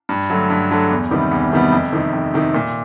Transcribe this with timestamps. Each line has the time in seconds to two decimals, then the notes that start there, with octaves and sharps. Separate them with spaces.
0.09 G2
0.30 D3 F#3 A3
0.50 G2
0.70 D3 F#3 A3
0.91 E2
1.11 C3 D#3 G3 B3
1.31 E2
1.52 C3 D#3 G3 B3
1.72 F2
1.93 C3 D#3
2.13 F2
2.34 C3 D#3
2.54 A#2